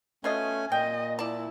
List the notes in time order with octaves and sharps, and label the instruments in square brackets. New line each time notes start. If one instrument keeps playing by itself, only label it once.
[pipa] B2 F4 D#5 [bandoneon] A3 C#4 G#5
[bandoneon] A#2 [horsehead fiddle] D#5 [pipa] G5
[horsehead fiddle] E4 [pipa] D5 A5